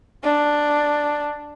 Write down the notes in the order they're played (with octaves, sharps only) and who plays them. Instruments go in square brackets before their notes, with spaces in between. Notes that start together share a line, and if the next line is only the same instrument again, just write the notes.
[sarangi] D4